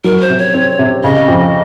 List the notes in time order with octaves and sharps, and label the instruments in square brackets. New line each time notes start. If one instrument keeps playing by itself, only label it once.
[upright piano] F#3 [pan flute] A#4
[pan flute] C5
[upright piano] C3
[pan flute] C#5
[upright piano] C4
C3
[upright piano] C#3 [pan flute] D#5
[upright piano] F2